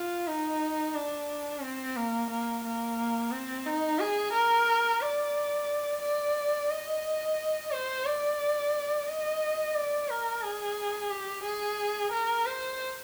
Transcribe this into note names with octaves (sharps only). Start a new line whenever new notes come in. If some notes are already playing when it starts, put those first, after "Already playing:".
Already playing: F4
D#4
D4
C4
A#3
A#3
A#3
C4
D#4
G#4
A#4
D5
D5
D#5
C5
D5
D#5
D5
A#4
G#4
G4
G#4
A#4
C5